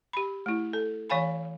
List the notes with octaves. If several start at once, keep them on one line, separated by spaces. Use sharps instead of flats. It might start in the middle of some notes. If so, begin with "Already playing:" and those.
G4 B5
A3 E4
A4
E3 C#5 F5 G#5 B5